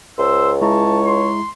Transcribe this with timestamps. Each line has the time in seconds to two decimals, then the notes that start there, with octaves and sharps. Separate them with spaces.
0.19 C#2 C5 E6
0.61 G#3 E4 C#5 A5 A#5
1.06 C6